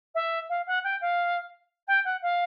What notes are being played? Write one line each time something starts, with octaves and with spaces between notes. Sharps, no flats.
E5
F5
F#5
G5
F5
G5
F#5
F5